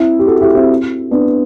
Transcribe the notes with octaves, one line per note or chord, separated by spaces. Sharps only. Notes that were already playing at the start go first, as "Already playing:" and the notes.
Already playing: C4 E4
G4
F#4 A4
E4 G4
C4 E4
B3 D4